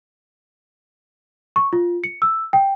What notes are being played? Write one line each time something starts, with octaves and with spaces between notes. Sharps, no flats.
C#6
F4
C#7
E6
G5